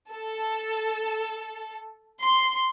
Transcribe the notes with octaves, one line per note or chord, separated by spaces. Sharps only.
A4
C6